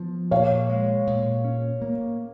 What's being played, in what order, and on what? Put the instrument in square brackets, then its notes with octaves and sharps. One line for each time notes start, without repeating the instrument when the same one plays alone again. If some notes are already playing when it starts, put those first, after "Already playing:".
Already playing: [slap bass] F3 B3
[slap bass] A#2 [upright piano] C#5 F5
[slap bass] G#3
A#2
C#4
A#3